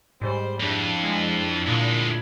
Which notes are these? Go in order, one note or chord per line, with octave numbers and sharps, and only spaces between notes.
G#2 G3 C5
F2 D4 E4
G#3
D2 A#2 G#3